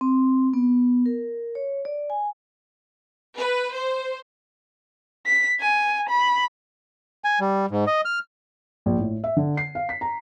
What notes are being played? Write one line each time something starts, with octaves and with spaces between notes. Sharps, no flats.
C4
B3
A#4
C#5
D5
G#5
B4
C5
B6
G#5
B5
G#5
G3
G#2
D#5
F6
A#1
A2
E5
D3
C7
F5
B6
A#5